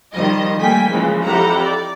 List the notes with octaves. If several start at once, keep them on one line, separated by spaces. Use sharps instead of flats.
D#3 F3 G3 D#5
G3 A3 A#3 G5 G#5 B6
C#3 E3 F3 G#3 A#3
F2 E4 G4 F#5 A#5
D5